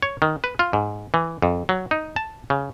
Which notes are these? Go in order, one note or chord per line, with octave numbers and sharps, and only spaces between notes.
C#5
D#3
B4
F4
G#2
E3
F2
F#3
D#4
A5
C#3